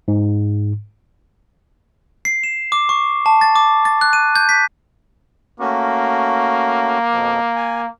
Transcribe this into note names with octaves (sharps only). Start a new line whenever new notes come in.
G#2
C7
E7
D6
C#6
A5
A6
D6
A6
F#6
D#7
G6
B6
A3 A#3 C#4 F#4
F2 B2 F3
G#5